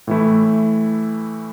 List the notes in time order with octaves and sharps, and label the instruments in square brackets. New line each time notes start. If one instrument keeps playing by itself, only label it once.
[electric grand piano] A2 E3 A3 E4